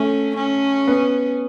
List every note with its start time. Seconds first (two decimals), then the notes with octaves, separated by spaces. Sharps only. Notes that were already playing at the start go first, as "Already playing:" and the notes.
Already playing: A3 C#4
0.36 C#4
0.88 B3